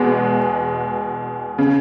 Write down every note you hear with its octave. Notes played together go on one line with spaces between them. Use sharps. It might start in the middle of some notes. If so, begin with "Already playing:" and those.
Already playing: E2 B2 G#3
C#3